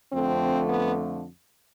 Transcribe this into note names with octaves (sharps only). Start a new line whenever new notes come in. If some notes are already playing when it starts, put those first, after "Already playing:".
F2 D3 F3 A3 C4
B3